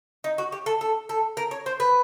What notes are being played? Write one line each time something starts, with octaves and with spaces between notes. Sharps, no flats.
D#4
F#4
G4
A4
A4
A4
A#4
C#5
C5
B4